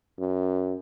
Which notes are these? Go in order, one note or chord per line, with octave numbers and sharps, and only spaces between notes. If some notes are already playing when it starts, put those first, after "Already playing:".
F#2